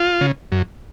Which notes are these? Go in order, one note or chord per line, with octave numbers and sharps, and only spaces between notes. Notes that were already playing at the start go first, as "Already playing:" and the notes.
Already playing: F4
C#3
F#2